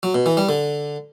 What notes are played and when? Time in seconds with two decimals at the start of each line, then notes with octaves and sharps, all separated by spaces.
0.03 F#3
0.15 B2
0.26 E3
0.37 G3
0.49 D3